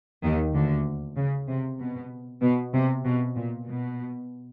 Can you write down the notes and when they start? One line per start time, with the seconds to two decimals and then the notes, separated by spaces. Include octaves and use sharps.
0.23 D#2 D#3
0.54 D2 D3
1.16 C#3
1.48 C3
1.79 B2
2.42 B2
2.73 C3
3.05 B2
3.35 A#2
3.67 B2